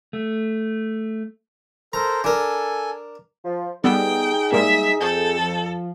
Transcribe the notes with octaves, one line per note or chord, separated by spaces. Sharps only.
A3
A4 A#4 C5 A#5
D4 A4 A#4 G#5
F3
G3 B3 D#4 G#4 A4 G5
G#2 G3 A#3 E5
F2 A4 G6
F3